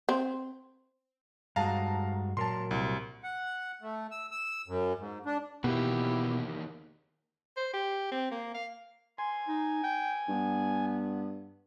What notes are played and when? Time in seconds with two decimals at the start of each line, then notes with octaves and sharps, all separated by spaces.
0.09 C4
1.56 G2 G#3 F#4 F5 A5 A#5
2.37 A#2 F#3 A#4 A5 C6
2.71 C2
3.23 F#5
3.82 A3
4.11 E6
4.31 E6
4.68 F#2
4.99 G#2
5.26 D4
5.64 E2 B2 D#3 A#3 E4 G4
7.57 C5
7.73 G4
8.12 C4
8.31 A#3
8.54 F5
9.18 G#5 C6
9.48 D#4
9.84 G5
10.29 G2 B3